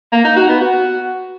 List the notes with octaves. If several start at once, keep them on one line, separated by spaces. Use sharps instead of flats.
A#3
D#4
F#4
B3
F#4